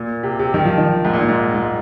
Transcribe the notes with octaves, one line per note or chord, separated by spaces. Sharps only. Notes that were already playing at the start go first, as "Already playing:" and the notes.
Already playing: A#2
C3
C3
D#3
F3
D#3
G#2
A#2
G#2
G#2